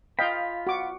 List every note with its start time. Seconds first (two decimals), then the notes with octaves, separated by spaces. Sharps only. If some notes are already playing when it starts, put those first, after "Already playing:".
0.19 F4 D#5 F5 G5 B5
0.67 F#4 D6